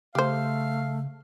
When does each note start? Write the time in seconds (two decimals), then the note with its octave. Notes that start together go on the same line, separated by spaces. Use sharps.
0.15 C#3 A3 G4 C5 F5